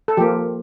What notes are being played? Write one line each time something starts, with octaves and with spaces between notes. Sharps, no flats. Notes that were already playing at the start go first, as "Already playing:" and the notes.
A4
F3 A#3 G4